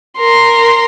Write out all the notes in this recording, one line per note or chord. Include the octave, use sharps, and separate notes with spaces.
A#4 C6